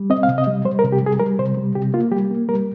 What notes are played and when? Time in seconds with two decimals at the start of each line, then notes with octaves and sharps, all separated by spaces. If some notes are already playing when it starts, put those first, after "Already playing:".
Already playing: G3
0.10 C4 D#5
0.23 F5
0.28 C3
0.38 D#5
0.47 G3
0.65 G3 C5
0.79 A#4
0.84 C3
0.92 G4
1.02 G3 G#4
1.20 G3 A#4
1.39 C3 C5
1.57 G3
1.75 C3 G4
1.94 A#3 F4
2.12 G3 G4
2.31 A#3
2.48 G3 A#4